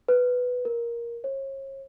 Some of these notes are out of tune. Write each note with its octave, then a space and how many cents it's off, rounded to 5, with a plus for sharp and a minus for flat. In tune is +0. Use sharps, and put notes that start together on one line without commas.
B4 +5
A#4 +10
C#5 -40